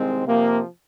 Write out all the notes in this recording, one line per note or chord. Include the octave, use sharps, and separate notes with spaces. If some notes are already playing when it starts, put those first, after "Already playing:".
Already playing: C2 D#3 G#3 C4
C3 F3 A#3